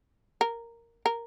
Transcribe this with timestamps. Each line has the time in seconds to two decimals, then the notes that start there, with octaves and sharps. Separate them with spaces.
0.41 A#4
1.06 A#4